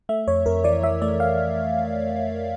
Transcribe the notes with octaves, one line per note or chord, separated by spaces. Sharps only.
A3 E5
F2 C#5
F2 A#4
E3 D5
E3 E5
A3 D5
F5